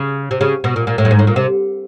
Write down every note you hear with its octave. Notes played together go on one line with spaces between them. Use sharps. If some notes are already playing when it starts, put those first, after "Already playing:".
Already playing: C#3
C3
C#3
B2
A#2
A#2
A2
G2
G#2
A2
A#2
C3